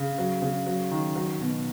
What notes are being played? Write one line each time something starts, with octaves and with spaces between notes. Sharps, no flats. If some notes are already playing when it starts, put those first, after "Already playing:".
Already playing: C#3
F#3
C#3
F#3
D#3
F#3
B2